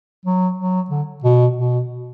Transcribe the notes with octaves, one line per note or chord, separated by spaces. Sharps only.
F#3
F#3
D3
B2
B2